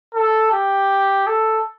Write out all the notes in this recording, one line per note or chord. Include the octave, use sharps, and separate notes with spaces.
A4
G4
A4